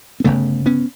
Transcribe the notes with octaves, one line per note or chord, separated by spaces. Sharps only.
C4
G1 F#2 C#3 A3 B3
B3 C#4